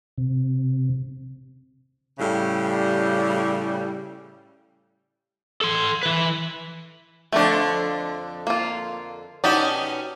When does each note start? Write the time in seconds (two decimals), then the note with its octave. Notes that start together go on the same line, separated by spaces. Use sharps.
0.18 C3
2.19 A2 C#3 G3
5.61 A4 C6
6.03 E3 B4
7.32 F2 D3 A3 D4 C5
8.47 A#3 F4
9.44 B2 C#4 D#4 F#4 G4 D5